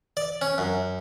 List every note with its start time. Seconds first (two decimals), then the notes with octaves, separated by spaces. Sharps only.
0.17 D5
0.42 C#4
0.58 F#2